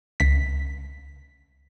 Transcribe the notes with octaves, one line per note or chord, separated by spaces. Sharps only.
C#2 B6